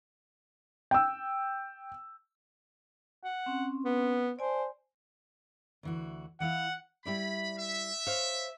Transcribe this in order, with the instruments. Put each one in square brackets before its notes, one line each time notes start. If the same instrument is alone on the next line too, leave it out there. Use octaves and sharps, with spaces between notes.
[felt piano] G5 E6
[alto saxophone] F#5
[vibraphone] C4 C#4
[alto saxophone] B3
[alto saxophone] C5 [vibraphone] D5 G#5 A5
[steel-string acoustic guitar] D2 E3 F#4
[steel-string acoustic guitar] E3 E4 F5 [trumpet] F#5
[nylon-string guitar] G3 E4 D5 [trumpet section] B5
[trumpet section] E5
[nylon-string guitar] C5 C#5 F5